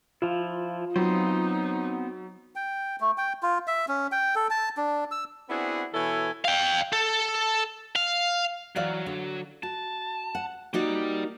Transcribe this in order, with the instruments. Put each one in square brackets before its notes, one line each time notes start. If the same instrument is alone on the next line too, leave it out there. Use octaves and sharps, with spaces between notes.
[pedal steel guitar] F3 E4 [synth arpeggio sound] F4
[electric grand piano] F#3 [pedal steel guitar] B3 C4 C5 [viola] D#4
[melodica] G5
A3
G5
F4
E5
C#4
G5
A4
A5
D4
E6
[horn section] B3 C4 D4 E4 F#4 G#4
B2 E3 E4 A4 C#5 G#5
[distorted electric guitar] F5 G5
A4
F5
[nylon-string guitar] E3 D5 F5 [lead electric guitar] F#3
[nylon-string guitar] D3
[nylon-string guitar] F#4 [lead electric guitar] A5
[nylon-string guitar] F#5
[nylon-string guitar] A#3 D#4 F#4 [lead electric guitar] G4 D5